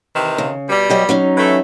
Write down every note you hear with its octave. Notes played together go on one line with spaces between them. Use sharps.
C3 D#3 E3
C#3
B2 G3
F#3 G4 D#5
F#3 C#4 D#4
E3 A3